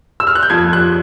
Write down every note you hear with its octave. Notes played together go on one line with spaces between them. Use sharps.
E6
F6
F#6
G6
F2 G#6
F2
F#6